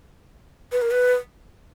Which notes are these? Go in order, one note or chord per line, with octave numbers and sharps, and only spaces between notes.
B4
A#4
B4